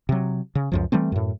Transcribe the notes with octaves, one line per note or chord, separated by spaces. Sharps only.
C3 F#3
C#3
C#2 F#2 F3
E3 G3 A3 C4
F#2 A2